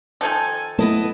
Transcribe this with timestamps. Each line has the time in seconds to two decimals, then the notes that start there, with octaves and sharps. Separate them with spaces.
0.21 D#3 F3 A4 G#5
0.79 A3 B3 E4 D#5 A5